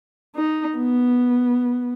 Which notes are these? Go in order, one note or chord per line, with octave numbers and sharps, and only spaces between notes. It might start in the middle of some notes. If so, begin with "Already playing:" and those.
D#4
B3